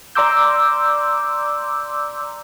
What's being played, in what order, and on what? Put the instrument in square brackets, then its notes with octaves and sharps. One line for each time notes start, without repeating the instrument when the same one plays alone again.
[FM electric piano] D5 A#5 C6 D6 E6 G6